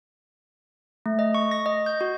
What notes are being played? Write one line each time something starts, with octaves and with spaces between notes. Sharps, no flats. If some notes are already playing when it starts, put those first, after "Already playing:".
A3
D#5
C#6
A#6
D#5
G6
F#4